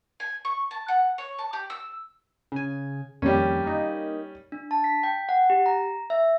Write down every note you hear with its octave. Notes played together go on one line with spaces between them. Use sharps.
G#5
C#6
A5
F#5
C#5
A5
G4
E6
C#3 G#5
F2 D#3 G3 A#3 C#4
A#3 D#4
D4
A5
B6
G5
F#5
G4
A#5
E5